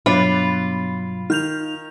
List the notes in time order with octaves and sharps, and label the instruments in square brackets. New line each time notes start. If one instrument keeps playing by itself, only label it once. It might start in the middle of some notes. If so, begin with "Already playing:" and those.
[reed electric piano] G2 B2 F#3 [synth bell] B3 D4 C#5 [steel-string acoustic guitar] F4 [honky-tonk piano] B5
[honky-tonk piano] D#3 [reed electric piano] D#4 [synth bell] F6 G6 F7